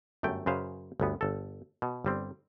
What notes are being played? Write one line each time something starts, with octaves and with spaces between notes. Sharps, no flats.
G1 F#2 A3 G5
F#2 C#3 B4 C5 F5
G1 D2 B3
G1 A4
B2
G1 G3 C4